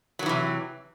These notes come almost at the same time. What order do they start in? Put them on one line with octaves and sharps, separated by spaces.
F#3 D#3 E3 C3